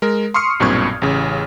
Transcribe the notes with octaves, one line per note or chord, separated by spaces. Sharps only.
G#3 A#4
C6 C#6 D#6 F6 C7 C#7
B1 G2 A#2 C4 C#6 G#6
A1 C#3